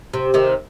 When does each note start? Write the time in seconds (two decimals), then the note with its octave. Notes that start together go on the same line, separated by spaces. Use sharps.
0.14 C3
0.34 C3 D#3